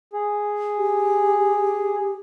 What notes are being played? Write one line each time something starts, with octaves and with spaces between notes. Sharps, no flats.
G#4
G4